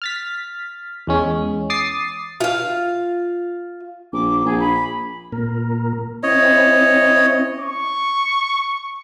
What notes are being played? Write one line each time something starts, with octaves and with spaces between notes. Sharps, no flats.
F6 A6 B6
E2 G#3 C#4
D6 D#6 A6 C7
F4 F5
A#1 D6
A#1 G#4
B5
A#2 A#4
C4 C#4 E4 C#5 D#5
C#6